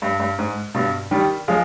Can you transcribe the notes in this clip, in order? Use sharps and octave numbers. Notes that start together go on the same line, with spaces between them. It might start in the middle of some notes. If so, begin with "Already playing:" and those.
G2
G2
G#2
G2 B2
D#3 G3
F3 G#3